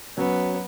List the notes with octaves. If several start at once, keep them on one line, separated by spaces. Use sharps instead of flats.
F#3 B3 C#4